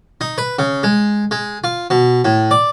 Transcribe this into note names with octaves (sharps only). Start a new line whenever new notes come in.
D#4
B4
C#3
G#3
G#3
F4
B2
A2
D5